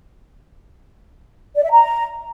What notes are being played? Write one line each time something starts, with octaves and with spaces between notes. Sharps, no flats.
D5
E5
A#5